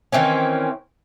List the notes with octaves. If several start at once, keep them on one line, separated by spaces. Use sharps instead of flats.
D#3 E3 C4 C#4